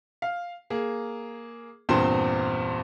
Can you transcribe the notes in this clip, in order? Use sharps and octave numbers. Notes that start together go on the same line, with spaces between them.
F5
A#3 G#4
E2 G2 A#2 C4 C5 C6